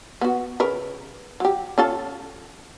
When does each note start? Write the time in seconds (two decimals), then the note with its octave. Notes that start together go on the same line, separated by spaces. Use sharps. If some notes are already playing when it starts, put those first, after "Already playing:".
0.21 B3 F#4
0.60 C#3 A#4 B4
1.40 F#3 G4
1.78 C#4 F4 A4